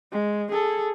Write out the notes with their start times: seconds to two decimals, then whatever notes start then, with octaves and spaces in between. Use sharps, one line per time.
0.12 G#3
0.52 G#4 A4